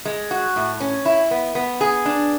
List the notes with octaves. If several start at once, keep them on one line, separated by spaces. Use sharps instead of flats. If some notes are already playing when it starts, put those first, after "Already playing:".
G#3
F#4
A2
C#4
E4
B3
B3
G#4
D4